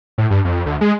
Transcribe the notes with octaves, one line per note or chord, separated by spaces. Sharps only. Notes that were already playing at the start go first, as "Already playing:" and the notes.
A2
G2
F2
D2
G#3